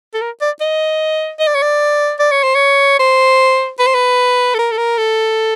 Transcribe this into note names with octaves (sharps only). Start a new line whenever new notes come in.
A4
A#4
D5
D#5
D#5
D5
C#5
D5
D5
C#5
C5
C#5
C5
B4
C5
B4
A4
A#4
A4
A#4
A4